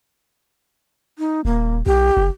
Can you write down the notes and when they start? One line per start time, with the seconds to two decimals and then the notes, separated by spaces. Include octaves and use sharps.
1.18 D#4
1.45 D#1 A#3
1.86 B1 G4
2.17 F#1